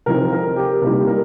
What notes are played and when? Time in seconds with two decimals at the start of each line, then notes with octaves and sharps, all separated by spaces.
0.06 C3 F3 C4 D#4 A#4
0.32 A#4
0.56 G4
0.81 C3 G3 A#3 D#4 A#4
1.07 A#4